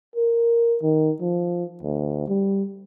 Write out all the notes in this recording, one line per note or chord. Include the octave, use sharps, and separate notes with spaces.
A#4
D#3
F3
D2
G3